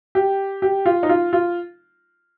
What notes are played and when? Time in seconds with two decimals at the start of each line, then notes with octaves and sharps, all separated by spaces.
0.15 G4
0.62 G4
0.86 F4
1.03 D#4
1.09 F4
1.33 F4